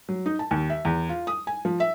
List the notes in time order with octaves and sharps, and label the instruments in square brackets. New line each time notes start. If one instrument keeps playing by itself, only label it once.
[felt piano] F#3
D#4
A5
D#2
E5
E2
F4
D#6
G#5
F3
E5